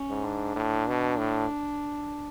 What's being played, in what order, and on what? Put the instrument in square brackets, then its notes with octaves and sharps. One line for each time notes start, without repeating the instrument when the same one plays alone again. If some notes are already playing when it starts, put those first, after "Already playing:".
Already playing: [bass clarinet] C#4
[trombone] G#2
[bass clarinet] D4
[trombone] A2
B2
A2